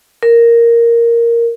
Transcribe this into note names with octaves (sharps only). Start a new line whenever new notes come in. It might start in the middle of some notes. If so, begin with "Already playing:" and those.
A#4